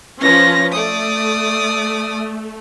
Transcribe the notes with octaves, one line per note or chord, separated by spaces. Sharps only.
F3 C#4 B4 A#6
A3 D5 D#6